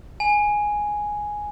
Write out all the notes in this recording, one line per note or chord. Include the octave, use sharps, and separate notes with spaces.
G#5